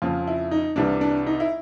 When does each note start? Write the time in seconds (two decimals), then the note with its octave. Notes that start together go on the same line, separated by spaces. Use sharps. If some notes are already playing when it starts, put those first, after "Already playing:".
0.02 F2 C#3 F3 F4
0.27 E4
0.51 D#4
0.76 C2 C3 E3 G3 D4
1.01 D4
1.26 D#4
1.40 E4